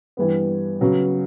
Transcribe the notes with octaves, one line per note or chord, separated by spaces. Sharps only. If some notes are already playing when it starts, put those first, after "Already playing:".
G2 E3 G3 B3
C#3 F#3 B3